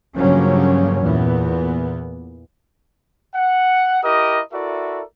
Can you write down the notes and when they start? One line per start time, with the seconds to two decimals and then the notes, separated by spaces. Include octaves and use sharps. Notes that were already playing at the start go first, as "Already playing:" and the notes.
0.16 G2 C#3 F3 F#3 A#3 C#4
1.02 E2 A#2 E3 B3
3.35 F#5
4.04 E4 G4 A#4 D#5 D#6
4.53 E4 F#4 A4 A#4 D5 E5